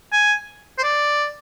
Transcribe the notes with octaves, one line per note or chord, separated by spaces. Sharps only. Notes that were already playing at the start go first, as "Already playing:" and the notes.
G#5
C5
D5